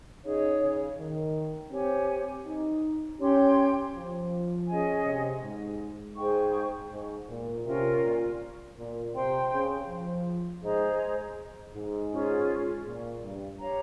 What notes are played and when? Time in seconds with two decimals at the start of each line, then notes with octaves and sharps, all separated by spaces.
0.23 C#3 D#4 G#4 C#5
0.60 C#3
0.98 D#3
1.71 C4 G4 C#5 G#5
2.46 D#4
3.19 C#4 G4 C#5 G5 C6
3.95 F3
4.68 C#4 G#4 D#5 G#5
5.05 C3
5.43 G#2
6.17 G#2 G#4 C5 G5 C#6
6.91 G#2
7.28 A#2
7.65 C3 C#4 F4 A#4
8.02 A#2
8.77 A#2
9.14 C3 C5 G5 C6
9.51 C#3
9.88 F3
10.62 G#2 G#4 C5 D#5 A#5
11.73 G#2
12.11 C#4 F4 G#4
12.85 A#2
13.21 G2
13.60 G4 C#5 F5 A#5